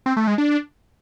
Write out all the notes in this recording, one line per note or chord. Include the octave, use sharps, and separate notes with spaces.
C4
A3
G#3
D4